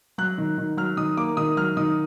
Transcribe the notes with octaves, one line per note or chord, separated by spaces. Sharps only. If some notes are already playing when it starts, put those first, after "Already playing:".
F#3 F#6
D#3
D#3
F#3 F6
D#3 D#6
A#3 D6
D#3 D#6
F#3 F6
D#3 D#6